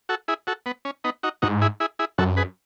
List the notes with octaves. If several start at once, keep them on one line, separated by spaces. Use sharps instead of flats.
F#4 A4
E4 G#4
F#4 A4
B3
C#4
B3 D#4
D#4 F#4
G#2 D#4 F#4
E4 G#4
E4 G#4
E4 G#4
F#2 F#4 A4
G#4 B4